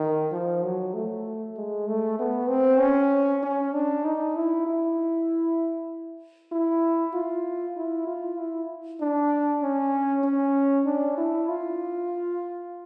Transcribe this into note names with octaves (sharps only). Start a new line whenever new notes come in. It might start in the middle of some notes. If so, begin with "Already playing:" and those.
Already playing: D#3
F3
F#3
A3
G#3
A3
B3
C4
C#4
C#4
D4
D#4
E4
E4
E4
F4
E4
F4
E4
D4
C#4
C#4
D4
E4
F4